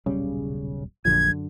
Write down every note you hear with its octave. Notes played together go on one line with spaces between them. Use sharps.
D#1 B1 C#3 G3
A#1 F#2 D3 G#6